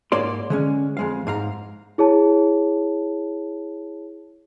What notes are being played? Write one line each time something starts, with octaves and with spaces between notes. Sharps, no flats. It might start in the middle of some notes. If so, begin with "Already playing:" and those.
G#2 A#3 C#5 D5 C6
D3 G#3 C#4
F2 G#3 F5
G#2 F5 A#5
E4 G#4 C#5 A5